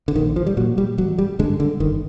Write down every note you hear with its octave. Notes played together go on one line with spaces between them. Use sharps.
D3
A#1 D#3
F3
G3
A#2 F#3
G3
A1 F#3
G3
G2 D3 G#3
D3
G1 D#3